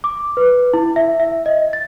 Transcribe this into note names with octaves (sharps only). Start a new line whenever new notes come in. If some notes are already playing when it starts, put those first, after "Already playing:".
D6
B4
E4
E5
E5
D#5
A6